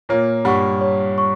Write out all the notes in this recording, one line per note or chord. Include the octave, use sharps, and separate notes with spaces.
A#2 A#3 C#5
G2 G3 F#5 C#6
C#5
C#6